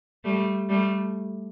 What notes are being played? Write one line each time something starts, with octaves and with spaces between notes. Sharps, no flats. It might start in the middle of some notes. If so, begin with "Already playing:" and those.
G3 A3
G3 A3